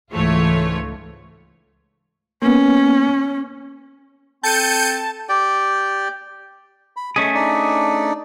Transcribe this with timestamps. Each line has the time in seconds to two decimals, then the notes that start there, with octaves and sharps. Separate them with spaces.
0.12 C#2 G#2 E3 A3 F4 C#5
2.42 A#3 B3 C#4
4.43 C4 A4 G5 A5 G6 C#7 D#7
5.29 G4 D5 G5
6.96 B5
7.16 A3 C#4 G#4 D#5
7.34 D4 D#4 D5